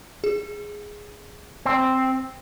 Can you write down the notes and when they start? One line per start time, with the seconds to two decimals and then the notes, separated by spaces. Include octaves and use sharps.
0.24 G#4
1.66 C4